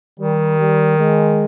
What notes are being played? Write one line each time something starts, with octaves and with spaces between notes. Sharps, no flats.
D#3 G3
G3
G#3